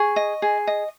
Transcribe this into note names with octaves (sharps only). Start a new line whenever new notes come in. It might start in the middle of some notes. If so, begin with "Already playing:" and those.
Already playing: G#4 C#6
D#5
G#4
D#5